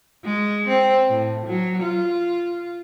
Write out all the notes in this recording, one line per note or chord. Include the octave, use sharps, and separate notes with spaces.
G#3
C4
A2
F#3
F4